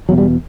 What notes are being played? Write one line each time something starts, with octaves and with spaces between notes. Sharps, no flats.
E2 B2 F#3
G3